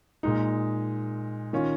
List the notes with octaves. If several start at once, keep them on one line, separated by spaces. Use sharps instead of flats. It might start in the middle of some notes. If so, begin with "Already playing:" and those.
A#2 G#3 D#4
D#3 C#4 F4